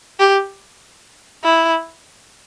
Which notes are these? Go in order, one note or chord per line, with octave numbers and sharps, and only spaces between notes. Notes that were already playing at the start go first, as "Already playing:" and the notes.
G4
E4